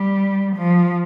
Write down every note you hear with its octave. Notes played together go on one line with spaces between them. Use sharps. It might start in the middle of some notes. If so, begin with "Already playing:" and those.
Already playing: G3
F3